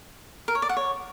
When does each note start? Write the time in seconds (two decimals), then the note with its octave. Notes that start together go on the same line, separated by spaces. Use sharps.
0.48 A#4
0.55 C#5
0.62 D5
0.69 F#5
0.77 C#5